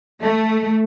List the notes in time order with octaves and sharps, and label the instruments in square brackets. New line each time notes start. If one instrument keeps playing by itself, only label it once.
[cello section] A3